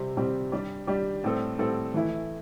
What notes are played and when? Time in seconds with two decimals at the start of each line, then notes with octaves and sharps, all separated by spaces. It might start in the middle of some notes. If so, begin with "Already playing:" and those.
Already playing: C3 G3 C4 G4
0.17 C3 G3 C4 G4
0.52 G3 D4 G4
0.87 G3 D4 G4
1.24 A2 G3 C4 A4
1.59 A2 G3 C4 A4
1.94 E3 A3 E4